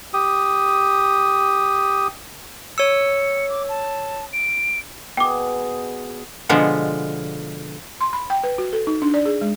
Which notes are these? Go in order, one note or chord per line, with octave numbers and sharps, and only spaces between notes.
G4 D#6
C#5 E6 C#7
D6
A5
D7
B2 G#4 G5 D6
B2 D3 F3 G#3 B3
C6
B5
G5
B4
F#4
A4
D#4
D4
D5
G#4
G#3